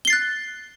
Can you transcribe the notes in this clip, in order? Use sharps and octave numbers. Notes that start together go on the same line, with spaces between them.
F#6 A6 C7 G7